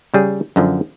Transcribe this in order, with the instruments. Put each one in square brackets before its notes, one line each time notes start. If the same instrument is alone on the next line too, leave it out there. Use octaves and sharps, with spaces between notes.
[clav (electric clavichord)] C#3 G3 G#4
F#2 D3 F3